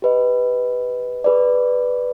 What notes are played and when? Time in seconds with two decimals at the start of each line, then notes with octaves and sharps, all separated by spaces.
0.02 G4 B4 D#5
1.24 G#4 B4 D5